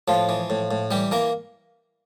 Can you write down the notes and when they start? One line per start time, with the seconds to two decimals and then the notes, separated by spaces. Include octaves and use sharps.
0.08 A2 F3 F4
0.29 E3
0.50 A2
0.71 A2
0.91 E3 G3 G4
1.11 E3 A#3 A#4